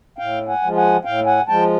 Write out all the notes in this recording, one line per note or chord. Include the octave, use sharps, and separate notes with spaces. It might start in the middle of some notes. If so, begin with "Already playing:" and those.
A2 F5 G5
F#5 G#5
F3 G#3
F#5 G#5
A2 F5 G5
F#5 G#5
F3 G#3 G5 A5